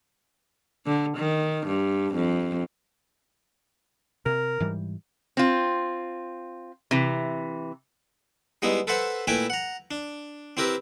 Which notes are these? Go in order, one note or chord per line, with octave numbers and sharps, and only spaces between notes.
D3
D#3
G2
F2
C3 A#4
G#2 E3 G3
C4 F4
C3 E3
G3 G#3 B3 D#4 E4
A4 B4 C5 E5 F#5
A#2 A3 E4 B4 G5 G#5
F#5 A#5
D4
C4 E4 G4 A#4 B4